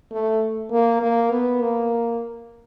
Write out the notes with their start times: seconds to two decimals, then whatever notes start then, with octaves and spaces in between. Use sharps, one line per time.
0.12 A3
0.72 A#3
1.02 A#3
1.31 B3
1.61 A#3